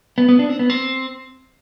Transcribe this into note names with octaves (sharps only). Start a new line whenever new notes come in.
B3
B3
D4
C4
B3
C4